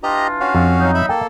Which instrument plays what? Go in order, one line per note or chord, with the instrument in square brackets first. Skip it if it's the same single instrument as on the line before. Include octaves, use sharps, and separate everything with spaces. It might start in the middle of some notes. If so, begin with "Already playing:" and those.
[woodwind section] E3 D4 F4 [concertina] G4 D#5 A#5
[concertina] C#4 F#4 F5
[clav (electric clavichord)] F2
[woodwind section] F#3 D#4
[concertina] E5 B5
[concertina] A#3 A4 [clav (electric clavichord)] G5